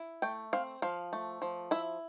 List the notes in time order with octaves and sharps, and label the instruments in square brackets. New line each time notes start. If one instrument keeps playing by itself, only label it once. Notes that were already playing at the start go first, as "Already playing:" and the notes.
Already playing: [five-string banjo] E4
A3 G5
C4 F5
F3 F5
A3
F3
E4 E5